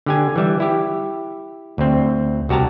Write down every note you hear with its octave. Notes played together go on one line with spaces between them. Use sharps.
D3 G4 G#5
E3 G3 E5
E4 G4
D2 C4
C2 F#4 G4 A5 A#5